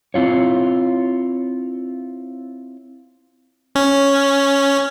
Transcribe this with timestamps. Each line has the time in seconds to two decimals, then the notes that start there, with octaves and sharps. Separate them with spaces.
0.14 C4 E4 F4 C#5
3.75 C#4